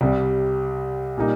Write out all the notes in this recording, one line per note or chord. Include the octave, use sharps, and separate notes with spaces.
C2 C3 G3
A#2 G3 A#3 D#4